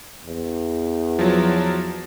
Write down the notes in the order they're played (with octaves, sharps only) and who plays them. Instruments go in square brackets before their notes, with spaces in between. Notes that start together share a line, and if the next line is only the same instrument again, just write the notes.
[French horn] E2
[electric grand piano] F3 F#3